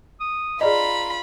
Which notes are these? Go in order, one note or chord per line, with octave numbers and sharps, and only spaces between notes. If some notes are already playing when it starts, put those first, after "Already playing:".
D#6
F4 G#4 D5 D#5 A#5 B5